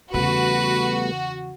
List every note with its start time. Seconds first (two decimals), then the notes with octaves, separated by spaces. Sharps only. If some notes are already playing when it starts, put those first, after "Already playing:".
0.14 E2 C#3 G3 A3 B3 F#4 B4